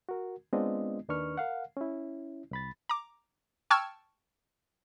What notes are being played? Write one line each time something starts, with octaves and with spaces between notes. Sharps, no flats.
F#4 A#4
G#3 B3 C4 D4 F4 D#5
D#2 D#3 D4 B4 C#6 F6
A#4 F5 F#5
C#4 E4
C2 B5 A6
A#5 D6
G5 A5 C#6 E6 F6 G#6